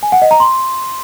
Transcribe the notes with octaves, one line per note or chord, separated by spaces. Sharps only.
G#5
F#5
D#5
A#5
C6